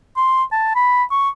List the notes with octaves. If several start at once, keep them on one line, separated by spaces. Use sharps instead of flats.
C6
A5
B5
C#6